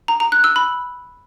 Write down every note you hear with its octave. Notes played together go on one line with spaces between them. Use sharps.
A#5
A#5
F#6
E6
B5